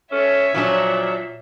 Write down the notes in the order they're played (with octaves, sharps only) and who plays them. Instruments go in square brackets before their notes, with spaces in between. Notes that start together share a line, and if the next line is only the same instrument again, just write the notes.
[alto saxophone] C#4 [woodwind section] A4 F6 [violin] C#5 E5
[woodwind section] A#2 [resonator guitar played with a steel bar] F3 C#4 D4 [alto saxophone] F#3